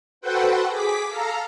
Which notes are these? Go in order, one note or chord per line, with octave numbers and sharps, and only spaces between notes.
F#4 A4 B4 C5 F#5 G5
G#4 D6 B6
A4 F5 A#5